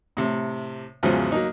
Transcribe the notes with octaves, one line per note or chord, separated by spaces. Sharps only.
A2 C3
E2 G#2 C#3 F3 F#3
F#3 A#3 D#4